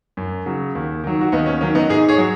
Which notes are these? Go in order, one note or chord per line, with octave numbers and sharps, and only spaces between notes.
F#2
C#3 F#3
D#2
D#3 F#3
F#4
D#2 B3 D#4
C#4
D#3 F#3 C#4
B3 D#4
G#2 D#4 G#4
G#4 C#5
F#3